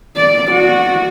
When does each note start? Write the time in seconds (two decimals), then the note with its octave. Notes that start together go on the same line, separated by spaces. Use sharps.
0.17 D5
0.52 F#4